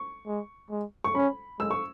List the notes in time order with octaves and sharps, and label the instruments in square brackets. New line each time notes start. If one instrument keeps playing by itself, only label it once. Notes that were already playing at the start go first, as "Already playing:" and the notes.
Already playing: [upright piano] C#6
[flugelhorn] G#3
G#3
[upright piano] C#6
[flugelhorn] C#4 [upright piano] B5
[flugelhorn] G#3 [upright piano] E6
[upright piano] C#6